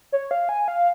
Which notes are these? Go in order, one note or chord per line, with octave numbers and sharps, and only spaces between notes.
C#5
F5
G#5
F5